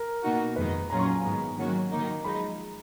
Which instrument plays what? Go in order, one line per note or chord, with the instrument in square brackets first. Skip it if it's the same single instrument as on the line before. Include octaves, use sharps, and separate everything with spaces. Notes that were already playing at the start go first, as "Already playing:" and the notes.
Already playing: [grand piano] A#4
[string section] B2 A#3 D#4 F#4
[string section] F2 D#3 G#3 D#4 [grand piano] B4
[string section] A#2 F#3 C#4 F4 G#4 [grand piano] A#5
[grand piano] C#6
A#5
G#5
[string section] G#2 D#3 G#3 B3 [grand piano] A#5
[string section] D#3 F#3 A#3 C#4 F#4
D#3 F#3 A#3 D#4
[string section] F3 G#3 D#4 [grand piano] B5
[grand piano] A#5